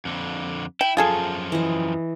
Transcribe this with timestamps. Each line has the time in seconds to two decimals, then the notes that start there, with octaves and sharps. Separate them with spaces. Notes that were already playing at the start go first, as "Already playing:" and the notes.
0.05 F2 D3
0.81 E4 G5
0.97 F#2 F3 F4 G#4 A4
1.52 E3 D#5